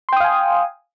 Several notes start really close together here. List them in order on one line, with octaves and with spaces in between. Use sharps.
C6 G5 D#6 F5 G#5